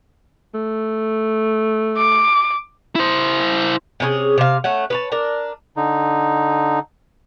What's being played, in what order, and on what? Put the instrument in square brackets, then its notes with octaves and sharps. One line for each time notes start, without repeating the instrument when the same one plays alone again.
[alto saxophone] A3
[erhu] D6
[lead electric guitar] E4 C5
[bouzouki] C3 C#4 E4 G#4
C3 F5
A3 C#4 F#5
B4 C#5 A5
D4 A#4
[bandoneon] D3 D#4